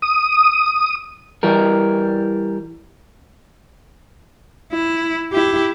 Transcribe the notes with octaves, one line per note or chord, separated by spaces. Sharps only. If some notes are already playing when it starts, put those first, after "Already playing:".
D#6
E3 G3 A#4
E4
E4 G4